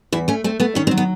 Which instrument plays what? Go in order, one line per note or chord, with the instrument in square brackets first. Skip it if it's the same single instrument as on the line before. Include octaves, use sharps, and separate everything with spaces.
[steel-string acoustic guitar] E2 E4
A3 C#4
A3 C4
A3 B3
D#3 C#4
C4
F#3
B3